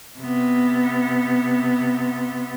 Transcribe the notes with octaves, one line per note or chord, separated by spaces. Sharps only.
C3 B3